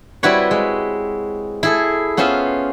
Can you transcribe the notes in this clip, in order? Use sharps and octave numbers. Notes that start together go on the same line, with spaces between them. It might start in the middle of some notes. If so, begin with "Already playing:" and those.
G3 C4 E4 F#4 B4 C#5
G#3
E4 G#4 A4
B3 C#4 F4 C5 E5 F#5